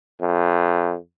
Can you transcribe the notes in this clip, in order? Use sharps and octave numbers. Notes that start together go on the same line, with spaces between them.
F2